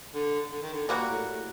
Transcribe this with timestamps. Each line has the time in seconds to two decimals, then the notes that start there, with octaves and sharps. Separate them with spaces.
0.13 D3
0.51 D3
0.62 D#3
0.73 D3
0.88 A#2 G3 A#3 F#4
1.08 A2
1.26 A2